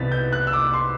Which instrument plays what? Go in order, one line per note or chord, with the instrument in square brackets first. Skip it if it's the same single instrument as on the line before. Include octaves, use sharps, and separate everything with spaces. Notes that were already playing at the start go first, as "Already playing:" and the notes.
Already playing: [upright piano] C2 C3 E3 B3 A6 B6
G6
F#6
E6
D6
C6